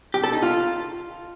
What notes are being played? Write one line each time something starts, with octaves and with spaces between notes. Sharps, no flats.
G4
A4
D#4
F4